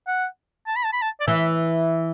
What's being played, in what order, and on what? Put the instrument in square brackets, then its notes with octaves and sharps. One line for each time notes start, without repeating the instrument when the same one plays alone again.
[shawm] F#5
A5
B5
A5
B5
A5
D5
[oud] E3 [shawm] E5